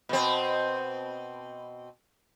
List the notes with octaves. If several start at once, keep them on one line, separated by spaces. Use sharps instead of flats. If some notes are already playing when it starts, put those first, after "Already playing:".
B2 C4